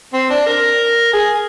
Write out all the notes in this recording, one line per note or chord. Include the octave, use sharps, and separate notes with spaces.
C4
D4
A#4
G#4